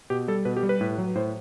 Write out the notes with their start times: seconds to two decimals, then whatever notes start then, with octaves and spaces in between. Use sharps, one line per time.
0.10 B2 G4
0.28 G3 A4
0.45 B2 B4
0.57 G4
0.63 G3
0.69 B4
0.81 A2
0.98 F#3
1.16 A2 C5